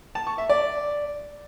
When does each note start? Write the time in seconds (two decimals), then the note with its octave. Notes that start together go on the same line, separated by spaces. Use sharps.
0.15 A5
0.27 C#6
0.38 E5
0.50 D5